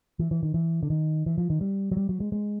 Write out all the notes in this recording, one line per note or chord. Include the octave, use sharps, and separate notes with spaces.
E3
E3
D#3
E3
D3
D#3
E3
F3
D#3
G3
F#3
G3
F#3
G#3
G#3